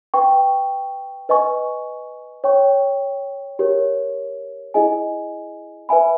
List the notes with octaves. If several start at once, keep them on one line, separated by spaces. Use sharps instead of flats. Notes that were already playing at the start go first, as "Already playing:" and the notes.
B4 G5 C#6
B4 D#5 G#5 C#6
C#5 G5 C#6
G4 A#4 C#5
E4 G#4 D#5 G#5
B4 E5 G#5 B5